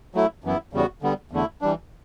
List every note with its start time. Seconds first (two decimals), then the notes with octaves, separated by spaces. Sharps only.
0.15 F#3 A3 E4
0.44 F#2 E3 B3 E4
0.73 E2 C#3 G3 B3 F#4
1.02 D3 G3 B3
1.31 E2 D3 A3 E4
1.61 E3 G3 D4